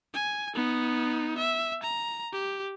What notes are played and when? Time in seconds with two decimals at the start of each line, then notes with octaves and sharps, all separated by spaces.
0.14 G#5
0.55 B3 D#4
1.38 E5
1.83 A#5
2.33 G4